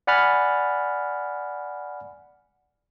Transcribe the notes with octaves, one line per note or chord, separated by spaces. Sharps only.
D5 F#5 G#5 B5 F6 A6